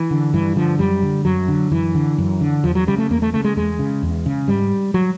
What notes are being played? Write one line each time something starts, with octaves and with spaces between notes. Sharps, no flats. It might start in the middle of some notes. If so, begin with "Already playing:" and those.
Already playing: E3
D3
G2 E3
D3 F3
F#2 G3
D3
F#2 F#3
D3
F#2 E3
D3
F#2
D3
E2 F3
F#3
C#3 G3
A3
E2 A#3
A3
C#3 A3
G#3
E2 G#3
C#3
E2
C#3
G#2 G3
F#3